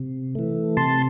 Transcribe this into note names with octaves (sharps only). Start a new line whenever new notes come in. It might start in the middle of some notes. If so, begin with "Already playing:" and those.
Already playing: C3
E3 A3
C3 A5 C6